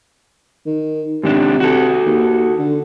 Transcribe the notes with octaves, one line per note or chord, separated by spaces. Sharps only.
D#3
G#2 C3 D#3 D4
F#4 A4
D#2
D3